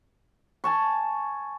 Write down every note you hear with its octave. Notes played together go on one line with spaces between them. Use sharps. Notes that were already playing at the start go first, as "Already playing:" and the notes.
G#5 A5 C#6